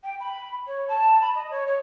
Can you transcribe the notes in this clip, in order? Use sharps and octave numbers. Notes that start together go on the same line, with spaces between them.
G5
B5
C#5
A5
B5
D#5
C#5
C#5